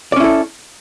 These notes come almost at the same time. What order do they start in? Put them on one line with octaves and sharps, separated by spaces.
D5 C#4 E4 A4